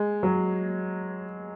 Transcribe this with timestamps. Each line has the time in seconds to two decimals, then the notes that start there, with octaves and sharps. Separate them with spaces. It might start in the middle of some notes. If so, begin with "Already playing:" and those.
Already playing: G#3
0.23 F#3